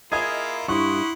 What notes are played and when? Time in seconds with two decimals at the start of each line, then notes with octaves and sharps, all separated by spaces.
0.12 A#3 E4 F4 G#4 D#5 G#6
0.68 G2 E4 F#5 C6 C#6 D#6